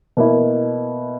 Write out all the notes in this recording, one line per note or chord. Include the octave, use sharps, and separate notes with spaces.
B2 A#3 E4